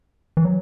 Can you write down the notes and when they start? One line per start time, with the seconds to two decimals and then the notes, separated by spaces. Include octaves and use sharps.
0.37 E3
0.45 F#3